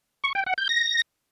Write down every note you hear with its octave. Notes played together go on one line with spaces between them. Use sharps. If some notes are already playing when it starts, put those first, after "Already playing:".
C#6
G5
F#5
G6
A#6